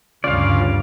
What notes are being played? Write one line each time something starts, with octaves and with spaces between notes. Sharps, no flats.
D2 G2 C#3 F4 D5 F5